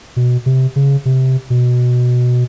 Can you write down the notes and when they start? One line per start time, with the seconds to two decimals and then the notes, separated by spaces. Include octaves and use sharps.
0.16 B2
0.46 C3
0.76 C#3
1.05 C3
1.50 B2